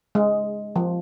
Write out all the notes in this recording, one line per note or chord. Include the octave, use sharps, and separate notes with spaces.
G#3
F3